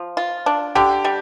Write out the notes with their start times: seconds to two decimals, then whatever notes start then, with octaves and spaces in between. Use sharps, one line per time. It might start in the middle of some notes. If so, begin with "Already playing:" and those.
Already playing: F3
0.17 F4
0.46 D4
0.75 D3 G4
1.05 G3